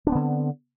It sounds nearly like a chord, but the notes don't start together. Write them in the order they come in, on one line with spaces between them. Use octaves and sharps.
D4 C4 B3 D3